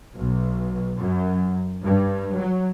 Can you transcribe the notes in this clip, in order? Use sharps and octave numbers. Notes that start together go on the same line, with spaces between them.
B1
F#2
G2
F#3